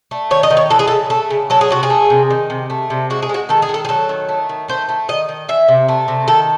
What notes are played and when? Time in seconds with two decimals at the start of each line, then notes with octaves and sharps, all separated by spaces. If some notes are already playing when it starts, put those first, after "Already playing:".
0.11 A3
0.31 D#3 C#5
0.43 D#5
0.50 D#3
0.57 C#5
0.70 E3 A4
0.79 G#4
0.88 A4
0.91 C#3
1.10 A3 A4
1.31 C#3
1.50 F#3 A4
1.61 G#4
1.70 C3 F#4
1.83 G#4
1.90 A3
2.10 C3
2.30 D#3
2.50 C3
2.70 A3
2.90 C3
3.10 G#3 F#4
3.22 G#4
3.29 G#3 F#4
3.49 D#3 A4
3.62 G#4
3.69 D#3
3.74 A4
3.85 G#4
3.89 F#3 A4
4.09 D#3
4.29 A3
4.49 D#3
4.68 A3 C5
4.89 A3
5.08 D#3 D#5
5.29 D#3
5.48 E3 E5
5.68 C3
5.88 A3
6.08 C3
6.28 D#3 A4